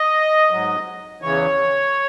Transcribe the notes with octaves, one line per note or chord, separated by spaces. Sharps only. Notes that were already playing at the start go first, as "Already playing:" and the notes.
Already playing: D#5
G#2 F#3
E2 C#3 E3 C#5